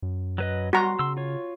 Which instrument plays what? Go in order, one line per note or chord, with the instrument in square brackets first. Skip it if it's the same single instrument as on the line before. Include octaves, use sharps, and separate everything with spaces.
[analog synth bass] F#2
[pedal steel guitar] F#3 B4 D#5
[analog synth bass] G3 [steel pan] F#4 A#5 [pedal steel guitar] C6
[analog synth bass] C#3 [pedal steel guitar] C6 E6
[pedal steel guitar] F4 C#5